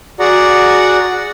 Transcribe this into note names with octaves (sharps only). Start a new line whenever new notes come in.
F#4 G#4 D5 F#5 A#5